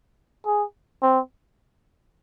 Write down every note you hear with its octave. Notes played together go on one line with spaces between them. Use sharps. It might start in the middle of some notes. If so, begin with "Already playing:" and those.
G#4
C4